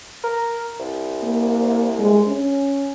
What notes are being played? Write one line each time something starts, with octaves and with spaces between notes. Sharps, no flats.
A#4
C2
A#3
G#3
C#4